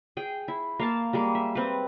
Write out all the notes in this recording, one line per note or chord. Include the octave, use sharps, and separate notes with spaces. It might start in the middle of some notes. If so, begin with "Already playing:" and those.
G#4 G5
E4
A#3 F5 A5
G3 G#3 A#3
E5
C4 B4